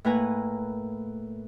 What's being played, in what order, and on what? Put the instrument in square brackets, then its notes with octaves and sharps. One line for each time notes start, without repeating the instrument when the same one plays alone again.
[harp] A2 A#3 B4 G#5 A#5